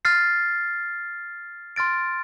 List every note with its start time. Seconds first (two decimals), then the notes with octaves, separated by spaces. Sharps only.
0.05 F6 A6 C7
1.76 C6 F6 A6 D7